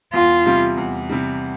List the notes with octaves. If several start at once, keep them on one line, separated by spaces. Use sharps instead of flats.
E2 F4
C3 G3
E2
C3 G3